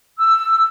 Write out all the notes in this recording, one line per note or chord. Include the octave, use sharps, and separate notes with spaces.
E6